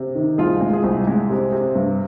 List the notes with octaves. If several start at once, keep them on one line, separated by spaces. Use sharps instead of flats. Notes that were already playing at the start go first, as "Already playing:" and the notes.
Already playing: C3
D#3
C2 F4 G#4
G#3
F4 G#4
C2
G#3
C3
C3
G2